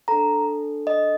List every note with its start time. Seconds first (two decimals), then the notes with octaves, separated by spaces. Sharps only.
0.08 D4 A4 A#5
0.87 D#5